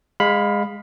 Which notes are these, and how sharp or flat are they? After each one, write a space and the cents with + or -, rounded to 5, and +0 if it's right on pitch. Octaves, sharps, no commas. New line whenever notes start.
G#3 -15 F5 +20 B5 +0